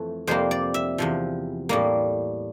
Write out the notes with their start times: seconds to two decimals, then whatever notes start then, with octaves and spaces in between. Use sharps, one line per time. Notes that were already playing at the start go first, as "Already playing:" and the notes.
Already playing: F2 E3 A3
0.27 F2 C3 G3 A#3 C5
0.51 D5
0.74 E5
0.98 E2 C3 F3
1.69 A2 G3 A#3